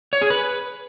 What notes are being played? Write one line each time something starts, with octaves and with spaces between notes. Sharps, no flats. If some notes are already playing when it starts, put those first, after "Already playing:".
C#5
G#4
B4